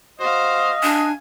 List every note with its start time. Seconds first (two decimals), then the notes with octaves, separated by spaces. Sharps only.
0.20 F#4 C5 D#5 F5
0.83 D4 G#5